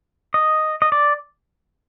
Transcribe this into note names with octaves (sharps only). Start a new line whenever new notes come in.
D#5
D#5
D5